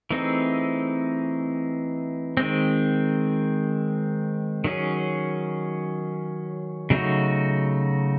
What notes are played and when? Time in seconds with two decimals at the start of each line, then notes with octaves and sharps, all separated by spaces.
0.10 E3 A3 C4 D#4 G#4
2.37 D#3 G#3 C4
4.64 D#3 F#3 C#4 G#4
6.90 C#3 F#3 A3 D#4 F#4